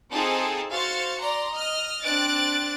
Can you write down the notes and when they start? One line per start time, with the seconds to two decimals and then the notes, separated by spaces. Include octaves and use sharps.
0.11 C4 D#4 F4 G#4 A4 A5
0.70 F#4 C5 F5 A6 C#7
1.19 D5 A#5 C6
1.50 D#5 F6
2.03 C4 D4 F#6 A6 D7